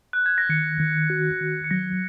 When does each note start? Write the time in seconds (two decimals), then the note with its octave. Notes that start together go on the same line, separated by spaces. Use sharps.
0.13 F#6
0.26 G#6
0.38 A#6
0.49 D#3 C#7
0.80 D#3
1.10 F#4
1.41 D#3
1.64 C#7
1.71 F#3 A#6